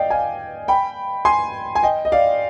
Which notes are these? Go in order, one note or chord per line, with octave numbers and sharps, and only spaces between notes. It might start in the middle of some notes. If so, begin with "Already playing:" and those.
Already playing: D5 D#5 F5 G5
F5 G#5
G5 B5
G#5 C6
G#5
D#5 G5
D#5
D5 F5